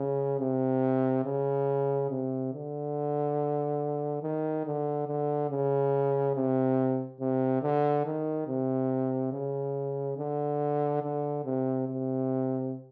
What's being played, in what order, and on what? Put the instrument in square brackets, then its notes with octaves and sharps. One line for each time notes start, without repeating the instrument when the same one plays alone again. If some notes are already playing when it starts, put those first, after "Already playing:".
Already playing: [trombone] C#3
C3
C#3
C3
D3
D#3
D3
D3
C#3
C3
C3
D3
D#3
C3
C#3
D3
D3
C3
C3